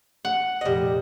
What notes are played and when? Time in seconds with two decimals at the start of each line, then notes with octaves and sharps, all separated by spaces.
0.25 F#5
0.61 F1 A#2 G3 D#5